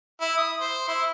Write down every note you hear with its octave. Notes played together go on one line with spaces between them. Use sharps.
E4
D#6
C5
E4